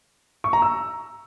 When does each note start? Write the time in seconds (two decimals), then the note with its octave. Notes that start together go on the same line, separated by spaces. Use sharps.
0.44 C#6
0.53 A#5
0.62 E6